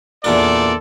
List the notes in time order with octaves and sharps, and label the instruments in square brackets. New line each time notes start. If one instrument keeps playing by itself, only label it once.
[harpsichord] E2 A#2 D4 [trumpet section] A4 C5 D5